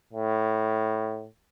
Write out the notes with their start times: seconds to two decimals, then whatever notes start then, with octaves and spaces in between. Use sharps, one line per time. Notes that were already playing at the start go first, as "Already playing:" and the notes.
0.13 A2